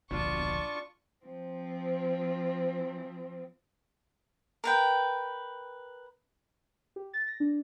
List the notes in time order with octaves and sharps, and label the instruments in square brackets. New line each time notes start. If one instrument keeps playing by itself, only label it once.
[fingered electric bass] D1 A#1 [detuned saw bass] B2 [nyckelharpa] D4 F4 [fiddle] C#6
[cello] F3 C4
[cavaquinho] A#4 B4 G5
[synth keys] G4
A6
A#6
D4